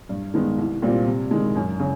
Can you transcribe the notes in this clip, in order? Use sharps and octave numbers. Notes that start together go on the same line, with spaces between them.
G2
D#3 G#3 B3
C2
A#2 G3 C4 F4
C3
D#3 G#3
F#2
C#3